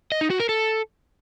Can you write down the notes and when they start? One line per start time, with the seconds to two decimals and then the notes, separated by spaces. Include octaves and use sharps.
0.12 D#5
0.21 D#4
0.30 F#4
0.40 A#4
0.49 A4